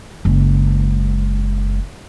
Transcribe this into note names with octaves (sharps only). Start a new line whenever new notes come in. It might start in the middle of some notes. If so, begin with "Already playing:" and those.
F#1 G#3